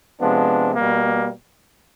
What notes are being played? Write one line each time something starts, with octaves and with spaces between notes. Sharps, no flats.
C3 F3 G#3 B3 D4
B2 G3 A#3